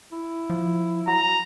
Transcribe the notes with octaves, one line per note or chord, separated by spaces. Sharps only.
E4
F3
F#3 A#5